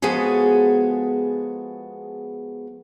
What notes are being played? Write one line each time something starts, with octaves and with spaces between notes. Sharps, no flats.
F3 G#3 B3 F#4 G#4 A4